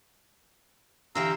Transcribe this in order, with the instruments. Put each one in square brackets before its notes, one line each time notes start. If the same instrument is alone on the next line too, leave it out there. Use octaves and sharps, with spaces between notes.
[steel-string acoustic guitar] D3 E3 G4 [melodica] F5 A#5 E6